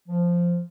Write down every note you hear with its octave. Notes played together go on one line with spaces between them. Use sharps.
F3